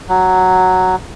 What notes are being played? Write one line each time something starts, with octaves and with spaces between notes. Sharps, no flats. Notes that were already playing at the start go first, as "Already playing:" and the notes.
F#3